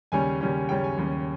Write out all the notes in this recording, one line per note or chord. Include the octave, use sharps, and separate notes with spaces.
D#2 C#3 G3 C#4 G#5
D#2 C#3 G3 C#4
D#2 C#3 G3 C#4 G5
G#5
D#2 C#3 G3 C#4